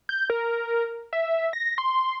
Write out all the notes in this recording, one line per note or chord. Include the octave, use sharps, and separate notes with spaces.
G6
A#4
E5
A#6
C6